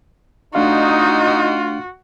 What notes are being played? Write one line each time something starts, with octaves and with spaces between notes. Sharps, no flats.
A3 D4 D#4 F4 F#4 F5